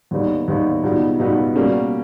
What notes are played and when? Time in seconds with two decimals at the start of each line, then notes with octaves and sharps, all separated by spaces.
0.11 D#2 D3 G3 B3 D#4
0.48 D#2 D3 G3 B3 D#4
0.83 C#2 B2 G3 B3 D#4
1.19 C#2 B2 G3 B3 D#4
1.56 B2 G3 A#3 C#4